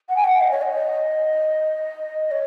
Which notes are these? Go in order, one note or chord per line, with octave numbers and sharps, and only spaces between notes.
F#5
G#5
F#5
D#5
C#5
D#5
C#5